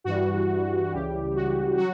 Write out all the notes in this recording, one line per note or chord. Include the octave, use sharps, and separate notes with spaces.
G2 E3 G3 F#4
C#2 C#3 E3 G3 G4
F#4
F#3 F#4